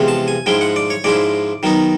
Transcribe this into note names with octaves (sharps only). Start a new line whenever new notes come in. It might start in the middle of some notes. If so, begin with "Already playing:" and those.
Already playing: E2 C3 F3 G#3 C#4
A5
G#5
G#2 F3 G#3 C#4 E4 G5
F#5
D5
C#5
G#2 F3 G#3 C#4 E4 D5
D#3 F#3 B3 D#4